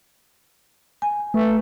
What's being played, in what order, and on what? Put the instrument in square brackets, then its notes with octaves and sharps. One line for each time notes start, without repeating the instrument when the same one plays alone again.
[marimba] G#5
[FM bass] A3 [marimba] B4